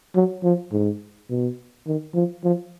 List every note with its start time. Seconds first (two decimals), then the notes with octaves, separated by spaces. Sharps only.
0.15 F#3
0.44 F3
0.72 G#2
1.30 B2
1.87 D#3
2.15 F3
2.44 F3